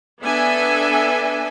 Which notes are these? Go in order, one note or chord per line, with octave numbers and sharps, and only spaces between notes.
B3 D4 A4 E5 G#5